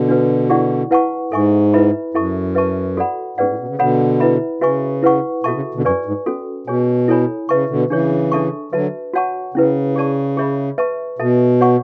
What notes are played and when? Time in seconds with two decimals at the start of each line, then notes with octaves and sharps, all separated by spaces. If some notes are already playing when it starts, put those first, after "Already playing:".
Already playing: B2 D3
0.08 D4 F#4 B4
0.50 E4 G#4 D5 F#5 C#6
0.91 E4 B4 F#5 A5 C#6
1.32 G#2 A4 E5 G#5 C#6
1.74 E4 B4 E5 B5
2.14 F#2 E4 A4 E5 A5 C#6
2.55 B4 E5 A5 C#6
2.97 F#4 A4 D5 F#5 B5
3.38 G#2 C#4 G#4 B4 D5 F#5
3.48 A2
3.59 B2
3.68 C#3
3.79 B2 D3 A4 C#5 F#5 B5
4.20 E4 B4 E5 B5
4.61 C#3 F#4 B4 E5 G#5 C#6
5.03 E4 B4 F#5 C#6
5.44 B2 F#4 A4 E5 A5 C#6
5.54 C#3
5.75 B2 D3
5.84 F#2 B4 D5 G#5 C#6
6.05 G#2
6.26 C#4 F#4 A4
6.67 B2 G#4 C#5 G#5
7.08 E4 A4 C#5 G#5 B5
7.49 C#3 B4 E5 A5 C#6
7.69 B2 D3
7.90 C#3 E3 D4 G#4 C#5
8.32 D4 A4 E5 A5 C#6
8.72 D3 F#3 F#4 B4 E5 A5
9.14 F#4 C#5 F#5 A5 C#6
9.54 C#3 C#4 E4 B4
9.96 G#4 D5 A5 C#6
10.37 G#4 C#5 E5 B5
10.78 B4 E5 A5 C#6
11.19 B2 A4 E5 A5
11.61 F#4 C#5 F#5 C#6